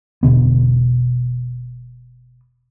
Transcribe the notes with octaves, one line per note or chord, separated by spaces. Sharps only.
E1 B2 D3 B3